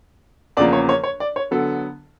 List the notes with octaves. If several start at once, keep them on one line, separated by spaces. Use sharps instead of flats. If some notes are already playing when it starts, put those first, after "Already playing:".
E2 C#3 F3 A#3 D5
C#5
C#5
C#5
D5
C#5
D3 F#3 B3 A4